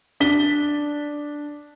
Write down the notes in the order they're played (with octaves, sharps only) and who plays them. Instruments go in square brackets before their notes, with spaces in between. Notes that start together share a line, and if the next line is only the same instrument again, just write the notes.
[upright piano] D4 B6 G7